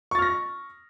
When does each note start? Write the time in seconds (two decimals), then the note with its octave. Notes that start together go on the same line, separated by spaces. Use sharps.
0.11 C#6
0.15 A6
0.19 F6
0.22 A#6